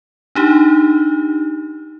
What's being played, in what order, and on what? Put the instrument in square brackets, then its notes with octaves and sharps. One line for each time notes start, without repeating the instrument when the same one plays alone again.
[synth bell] D4 D#4 G4